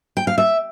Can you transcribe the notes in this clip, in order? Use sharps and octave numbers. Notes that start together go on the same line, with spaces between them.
G5
F5
E5